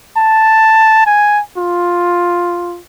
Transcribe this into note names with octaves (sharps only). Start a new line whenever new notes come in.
A5
G#5
F4